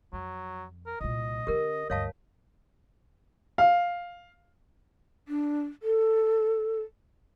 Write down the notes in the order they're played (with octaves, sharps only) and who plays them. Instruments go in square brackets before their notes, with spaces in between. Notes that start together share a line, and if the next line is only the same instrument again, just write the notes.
[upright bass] F2 [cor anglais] F#3
[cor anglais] A#4
[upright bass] C2 A#2 [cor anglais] D#5
[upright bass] D3 C#4 [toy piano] G4 A#4
[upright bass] D2 G2 [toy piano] C#5 F5 A5 [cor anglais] D#5
[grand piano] F5
[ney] D4
A4